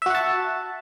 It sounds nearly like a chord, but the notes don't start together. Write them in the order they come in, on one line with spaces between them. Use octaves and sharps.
E5 F#4 F#5 A5